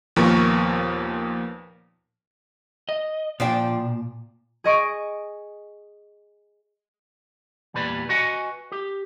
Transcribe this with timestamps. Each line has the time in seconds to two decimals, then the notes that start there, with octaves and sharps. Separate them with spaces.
0.16 D#2 A#2 F3 B3 A#4 C#6
2.89 D#5
3.40 A#2 F3 D4 G5
4.64 G#4 D#5 C#6 D7
7.74 E2 A#2 G3 B4 D5
8.09 F#4 B4 D#5 F#5 G#5
8.72 G4